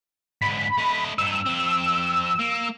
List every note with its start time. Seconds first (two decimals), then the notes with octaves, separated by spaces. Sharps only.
0.42 G#2 D3 B5
0.78 A3 D#5
1.18 G2 D#4 E6
1.46 F2 C4
2.39 A#3